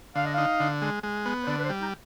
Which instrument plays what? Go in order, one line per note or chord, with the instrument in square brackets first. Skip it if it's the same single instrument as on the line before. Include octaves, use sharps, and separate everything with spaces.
[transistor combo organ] D3 [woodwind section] F5
[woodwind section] D#5
[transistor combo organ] D#4 [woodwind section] F5
[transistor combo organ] D3
G#3
G#3
B3
[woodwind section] C5
[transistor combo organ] D3 [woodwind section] D5
[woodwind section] B4
C5
[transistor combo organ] G3
[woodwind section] D#4